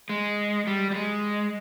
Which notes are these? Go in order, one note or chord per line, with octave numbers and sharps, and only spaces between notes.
G#3
G3
G3
G#3